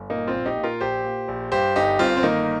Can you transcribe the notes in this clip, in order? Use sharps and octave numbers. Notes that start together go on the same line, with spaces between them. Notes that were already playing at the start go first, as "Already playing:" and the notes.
Already playing: G1
A#2 A#3 D#4
C4 F4
A#1
D#4 G4
A#2
F4 A#4
A#1 G4 C5
A#2
A#1
G2 G4 C5
G1 D#4 G4
G1 C4 F4
C4
D#3 A#3 D#4